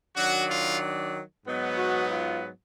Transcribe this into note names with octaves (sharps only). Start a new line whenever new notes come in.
D#3 F#3 D4 F#4
F4
G#2 F#3 B3 D#4
F#4
F4